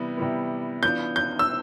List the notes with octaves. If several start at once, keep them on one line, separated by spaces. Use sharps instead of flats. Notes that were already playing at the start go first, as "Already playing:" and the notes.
Already playing: C3 E3 G3 B3
C3 E3 G3 B3
E3 B3 D4 F4 G6
G6
E6